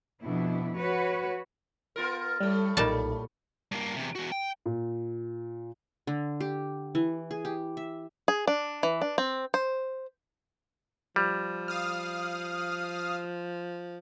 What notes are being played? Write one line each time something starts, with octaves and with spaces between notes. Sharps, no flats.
F2 B2 D4 E4
F#4 B4 C#5
B3 F4 A#4
A2 G3 A3
B1 A#2 G3 D#4 A5
G2 A#3
E2 C3
E2 F#4
G5
A#2
D3
G4
E3
G#4
G4
E5
G#4
D4
E3
D4
C4
C5
F3 G3
F5 D#6 F6